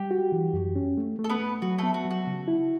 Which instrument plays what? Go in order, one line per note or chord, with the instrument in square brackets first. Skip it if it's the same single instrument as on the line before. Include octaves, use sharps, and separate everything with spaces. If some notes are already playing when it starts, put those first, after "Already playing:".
Already playing: [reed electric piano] G3 [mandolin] G4
[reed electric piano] F#4
E3
F#2
C#4
A3
A3
[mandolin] A4
B3 B4
[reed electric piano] A3
[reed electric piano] F#3 [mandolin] F#4
[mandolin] A3 A4 [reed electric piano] B3
[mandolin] F#4
[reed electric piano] F#3
[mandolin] F#4
[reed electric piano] C#3
E4